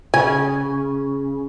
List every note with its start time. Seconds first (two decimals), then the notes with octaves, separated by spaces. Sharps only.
0.14 C#3 G#5